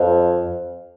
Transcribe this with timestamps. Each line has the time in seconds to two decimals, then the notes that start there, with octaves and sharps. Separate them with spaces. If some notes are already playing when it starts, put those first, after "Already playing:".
Already playing: F2